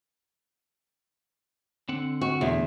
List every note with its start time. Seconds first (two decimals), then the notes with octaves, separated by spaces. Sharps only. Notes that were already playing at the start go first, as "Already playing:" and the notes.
1.89 D3 C4 F#5
2.21 F#4
2.41 E2 B2 D3 A3